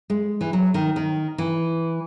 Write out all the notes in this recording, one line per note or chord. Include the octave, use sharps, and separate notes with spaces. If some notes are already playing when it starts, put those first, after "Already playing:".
G#3
E3
F#3
D#3
D#3
E3